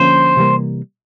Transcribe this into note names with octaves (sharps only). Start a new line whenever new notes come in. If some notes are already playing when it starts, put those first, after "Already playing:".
Already playing: D3 F3 A#3 C#4 C5
C3 E3 G3 A#3